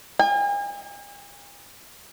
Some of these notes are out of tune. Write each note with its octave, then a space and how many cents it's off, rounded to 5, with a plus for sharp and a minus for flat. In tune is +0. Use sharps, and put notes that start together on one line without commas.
G#5 -45